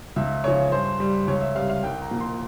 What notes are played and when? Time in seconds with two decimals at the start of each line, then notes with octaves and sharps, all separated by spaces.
0.16 C#2 E5
0.44 C#3 F3 C#5
0.72 G2 C5
1.00 G3
1.28 C#2 C#5
1.41 E5
1.55 C3 G3 F5
1.70 F5
1.83 C2 G5
2.02 A#5
2.11 A#2 F3
2.20 C6